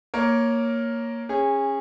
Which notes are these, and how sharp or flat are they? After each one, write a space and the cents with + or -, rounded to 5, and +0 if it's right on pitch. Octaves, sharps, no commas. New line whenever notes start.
A#3 +0 A#4 +0 C#5 +0
C#4 -15 G#4 -25